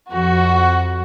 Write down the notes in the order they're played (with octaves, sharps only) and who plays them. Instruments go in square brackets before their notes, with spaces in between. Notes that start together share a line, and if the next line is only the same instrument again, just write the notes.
[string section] F2 F#4